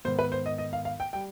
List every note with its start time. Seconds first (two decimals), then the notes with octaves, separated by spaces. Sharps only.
0.05 G#2 D#3 B3 C5
0.19 B4
0.32 C5
0.46 D#5
0.58 D#5
0.73 F5
0.85 F5
1.00 G5
1.13 G3 G5